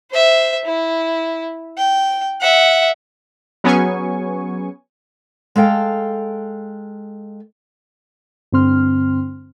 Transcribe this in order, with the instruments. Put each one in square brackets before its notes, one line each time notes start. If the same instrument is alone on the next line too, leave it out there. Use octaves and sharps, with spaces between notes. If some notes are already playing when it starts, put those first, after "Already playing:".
[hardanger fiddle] C5 E5
E4
G5
E5 F#5
[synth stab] F#3 B3 C#4 G#4 G#5 C#6
[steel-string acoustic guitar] G#3 A4 F5 G5
[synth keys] G2 D3 C4 C6 F6